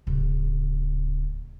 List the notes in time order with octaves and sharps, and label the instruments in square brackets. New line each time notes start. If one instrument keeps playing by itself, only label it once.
[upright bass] D1 C#3